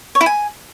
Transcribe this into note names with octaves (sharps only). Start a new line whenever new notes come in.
C#5
E4
G#5